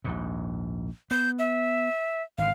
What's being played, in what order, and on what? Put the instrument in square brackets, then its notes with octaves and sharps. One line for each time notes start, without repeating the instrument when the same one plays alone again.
[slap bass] A#1 D#2 G#2
[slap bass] B3 [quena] G6
[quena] E5
[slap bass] G#1 D3 [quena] F5